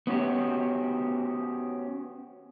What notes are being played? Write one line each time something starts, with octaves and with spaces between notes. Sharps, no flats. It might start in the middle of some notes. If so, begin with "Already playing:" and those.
B3 C#4 F#4 G4